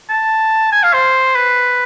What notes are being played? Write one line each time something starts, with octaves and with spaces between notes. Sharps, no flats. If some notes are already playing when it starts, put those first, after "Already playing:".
A5
G#5
F5
C5
B4